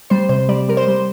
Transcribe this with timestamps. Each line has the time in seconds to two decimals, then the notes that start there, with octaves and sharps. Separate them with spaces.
0.10 G3 C5
0.29 C3 C5
0.49 G3 D5
0.68 G3 A#4
0.77 C5
0.88 G3